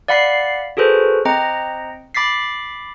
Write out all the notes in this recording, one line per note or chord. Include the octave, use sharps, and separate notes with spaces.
D5 F5 F#5 B5 B6 C7
F#4 G#4 A4 B4 C5
C4 D#5 G5 A#5 C#7
B5 D6 A6 B6 C7